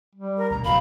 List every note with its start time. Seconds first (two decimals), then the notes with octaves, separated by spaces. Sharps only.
0.15 G3
0.38 A#4
0.51 D2 B2 A#5
0.65 E1 B1 B2 F5 B5